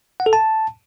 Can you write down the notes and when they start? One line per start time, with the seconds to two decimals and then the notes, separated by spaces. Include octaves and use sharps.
0.20 F#5
0.26 A4
0.33 A5